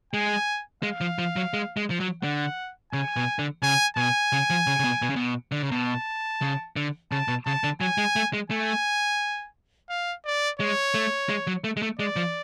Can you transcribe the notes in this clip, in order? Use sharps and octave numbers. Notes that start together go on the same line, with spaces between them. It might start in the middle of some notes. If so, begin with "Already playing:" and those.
G#3 G#5
G#3 F5
F3
F3
F#3
G#3
G#3
F3
F#3
D3 F#5
C#3 G#5
B2
D3
C#3 G#5
B2 G#5
C#3
F3
C#3
C#3
B2
B2
C#3
B2
D3
C#3
B2 A5
C#3
D3
C#3 A5
B2
C#3 A5
D3
F#3 G#5
G#3
A3
G#3
A3 G#5
F5
D5
G#3 C#5
A3
G#3
F#3
A3
G#3
A3
G#3 D5
F3